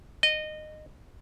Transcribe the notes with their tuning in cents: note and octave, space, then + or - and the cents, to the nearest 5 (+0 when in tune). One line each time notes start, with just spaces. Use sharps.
D#5 -20